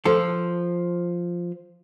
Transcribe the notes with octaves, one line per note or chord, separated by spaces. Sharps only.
F3 A4